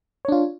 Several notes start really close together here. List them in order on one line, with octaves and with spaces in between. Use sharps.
C#5 D4 F4